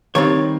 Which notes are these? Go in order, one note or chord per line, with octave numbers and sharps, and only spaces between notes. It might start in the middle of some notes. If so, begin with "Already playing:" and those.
D#3 G3 C4 D#4 C#5